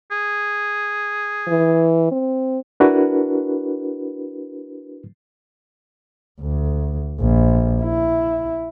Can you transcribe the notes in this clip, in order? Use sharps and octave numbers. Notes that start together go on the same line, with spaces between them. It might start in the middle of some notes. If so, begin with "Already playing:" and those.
G#4
E3
C4
D4 E4 F#4 A#4 B4
D2
A#1
E4